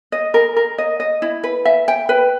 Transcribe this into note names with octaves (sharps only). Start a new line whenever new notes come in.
D#5
A#4
A#4
D#5
D#5
E4
B4
E5
G5
B4